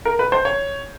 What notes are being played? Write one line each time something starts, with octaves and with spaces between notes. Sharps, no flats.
A#4
B4
C5
C#5